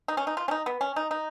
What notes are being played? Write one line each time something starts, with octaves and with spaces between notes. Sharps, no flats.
D#4
C#4
D#4
F4
C#4
D#4
B3
C#4
D#4
D#4